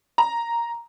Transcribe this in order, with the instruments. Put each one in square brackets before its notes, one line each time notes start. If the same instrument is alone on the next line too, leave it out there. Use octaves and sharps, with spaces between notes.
[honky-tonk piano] A#5